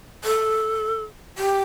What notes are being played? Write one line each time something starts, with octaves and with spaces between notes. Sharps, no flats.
A4
G4